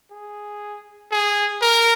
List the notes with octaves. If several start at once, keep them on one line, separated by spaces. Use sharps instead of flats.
G#4
G#4
A#4